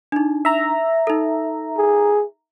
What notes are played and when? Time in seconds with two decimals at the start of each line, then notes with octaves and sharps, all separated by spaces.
0.12 D4 D#4
0.45 E5 A#5
1.07 D#4 A4
1.77 G#4